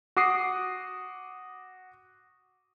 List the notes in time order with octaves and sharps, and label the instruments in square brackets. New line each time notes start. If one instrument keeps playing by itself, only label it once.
[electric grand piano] F#4 D6 D#6 C7